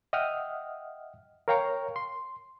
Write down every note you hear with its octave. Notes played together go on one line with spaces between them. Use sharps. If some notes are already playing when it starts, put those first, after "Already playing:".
D#5 E5 F#5 G5 D#6 F6
A#4 C#5 F5 G5 A#5 C#6
C6